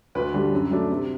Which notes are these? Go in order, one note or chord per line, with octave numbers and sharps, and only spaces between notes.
D2 B4
D3 G3
F#2
F#3 A3 D4
C3